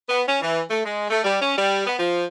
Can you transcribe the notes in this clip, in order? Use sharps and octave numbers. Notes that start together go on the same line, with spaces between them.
B3
C#4
E3
A3
G#3
A3
G3
C#4
G3
B3
F3